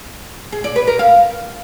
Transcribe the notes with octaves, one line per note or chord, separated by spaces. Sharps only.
G#4
D5
B4
A#4
F5